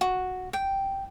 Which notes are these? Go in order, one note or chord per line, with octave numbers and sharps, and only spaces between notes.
F#4
G5